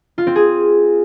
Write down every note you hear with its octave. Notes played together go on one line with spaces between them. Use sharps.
F4
C4
G#4